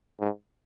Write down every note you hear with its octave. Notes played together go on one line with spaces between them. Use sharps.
G#2